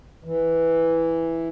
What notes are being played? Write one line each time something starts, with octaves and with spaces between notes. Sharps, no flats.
E3